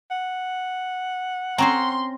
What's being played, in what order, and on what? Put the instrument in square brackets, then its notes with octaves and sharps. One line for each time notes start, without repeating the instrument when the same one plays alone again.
[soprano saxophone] F#5
[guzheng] C4 C#4 C5 [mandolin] A#5 [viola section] C6